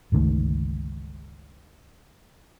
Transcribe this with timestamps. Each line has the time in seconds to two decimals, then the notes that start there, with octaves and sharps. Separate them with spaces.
0.12 G1 C#2 D#3 A3